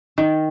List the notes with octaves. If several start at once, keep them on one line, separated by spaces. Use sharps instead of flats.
D#3